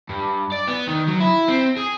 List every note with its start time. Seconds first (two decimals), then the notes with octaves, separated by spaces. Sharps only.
0.09 G2
0.52 D5
0.68 B3
0.88 D#3
1.08 F#3
1.21 E4
1.49 C4
1.76 G#4